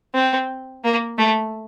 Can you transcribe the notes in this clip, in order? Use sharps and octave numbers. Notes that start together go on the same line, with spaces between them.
C4
A#3
A3